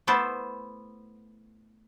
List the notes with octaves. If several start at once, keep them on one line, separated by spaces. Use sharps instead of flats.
A3 B3 E4 C5 A5